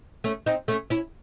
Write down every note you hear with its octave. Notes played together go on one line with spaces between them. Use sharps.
A3 C#4
C4 D#4
A3 C#4
C#4 E4